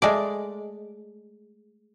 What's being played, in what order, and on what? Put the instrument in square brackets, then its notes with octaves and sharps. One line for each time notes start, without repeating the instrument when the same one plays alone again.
[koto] G#3 A3 D5